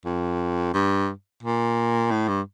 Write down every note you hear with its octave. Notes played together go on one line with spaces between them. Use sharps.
F2
G2
A#2
A2
G2